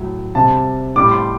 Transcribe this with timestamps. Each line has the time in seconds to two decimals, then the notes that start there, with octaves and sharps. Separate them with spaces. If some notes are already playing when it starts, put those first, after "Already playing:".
Already playing: A2 F#3
0.35 C3 G3 A5
0.96 A2 G3 D6
1.11 C6